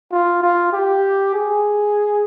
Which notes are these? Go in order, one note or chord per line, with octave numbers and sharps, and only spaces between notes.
F4
F4
G4
G#4